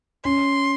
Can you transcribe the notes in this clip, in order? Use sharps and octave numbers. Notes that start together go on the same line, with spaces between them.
C#4 C6